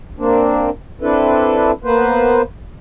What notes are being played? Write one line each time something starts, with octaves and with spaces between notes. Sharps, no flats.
A#3 C4 D4
C4 D4 E4 A4 B4
A#3 B3 B4 C5